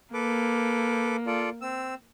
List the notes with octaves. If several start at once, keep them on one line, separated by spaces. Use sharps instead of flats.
A#3 A4 B4 D6
F4 A4 D5
C4 E6